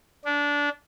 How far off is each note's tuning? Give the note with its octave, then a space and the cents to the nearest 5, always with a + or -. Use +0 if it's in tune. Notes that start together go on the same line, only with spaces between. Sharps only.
D4 -20